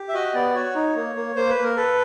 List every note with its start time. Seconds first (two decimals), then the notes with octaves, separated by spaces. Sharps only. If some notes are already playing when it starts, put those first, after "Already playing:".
Already playing: G4
0.09 E5
0.14 F#4 D#5
0.34 B3 D5
0.55 F#4 C#5
0.75 D#4
0.95 A#3
1.16 A#3
1.36 A#3 C5
1.50 B4
1.56 A#3
1.63 A#4
1.76 A4 B4